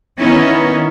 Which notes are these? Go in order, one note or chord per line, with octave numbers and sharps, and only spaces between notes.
D#3 B3 C#4 D#4 E4